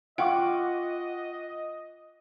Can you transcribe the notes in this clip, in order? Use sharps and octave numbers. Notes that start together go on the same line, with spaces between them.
F4 D#5 F#5 G5 C#6 D6